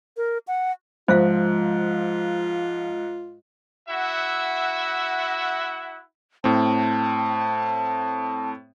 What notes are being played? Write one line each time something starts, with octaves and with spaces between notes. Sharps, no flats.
A#4
F#5
G#2 F3 F4 C5 E5 F5
E4 F#4 E5 F#5
A2 C4 A5